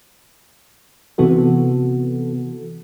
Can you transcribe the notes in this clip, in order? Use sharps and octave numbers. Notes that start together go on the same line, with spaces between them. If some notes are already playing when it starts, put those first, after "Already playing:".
C3 E3 B3 F#4 A4